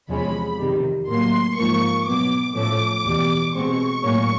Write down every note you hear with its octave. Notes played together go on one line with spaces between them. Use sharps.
E2 C3 F3 G#3 C#4 B5
F2 C3 D#3 G3
A2 F#3 A#3 C6
G#2 F3 A#3 C#6
B2 F#3 B3 D6
A2 F3 A3 C#4 D6
E2 B2 G3
B2 G#3 C4 C#6
A2 F#3 A#3 C#4